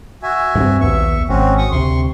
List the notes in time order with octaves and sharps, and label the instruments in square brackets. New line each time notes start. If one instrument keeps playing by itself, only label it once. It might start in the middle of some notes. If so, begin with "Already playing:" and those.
[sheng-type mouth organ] F#4 E5 G#5
[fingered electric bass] G2 C4
[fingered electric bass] A#1 D#2 B3 [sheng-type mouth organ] E5 C#6
[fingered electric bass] G#1 [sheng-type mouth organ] C4 C#4 F#4
[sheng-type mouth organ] C#6 D#6
[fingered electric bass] D2 C3 [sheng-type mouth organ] C6 C#6